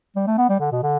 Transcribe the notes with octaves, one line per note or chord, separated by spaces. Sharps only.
G3
A3
B3
G3
D3
B2
D3